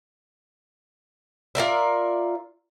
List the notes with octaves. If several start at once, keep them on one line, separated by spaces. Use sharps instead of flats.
F4 A#4 D5 E5